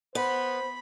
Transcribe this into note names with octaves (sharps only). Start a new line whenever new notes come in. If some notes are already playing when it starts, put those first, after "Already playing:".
B3 C5 B5